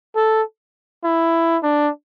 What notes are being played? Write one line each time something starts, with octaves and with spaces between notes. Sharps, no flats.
A4
E4
D4